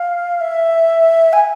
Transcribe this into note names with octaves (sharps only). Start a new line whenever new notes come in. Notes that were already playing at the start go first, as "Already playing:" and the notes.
Already playing: F5
E5
G#5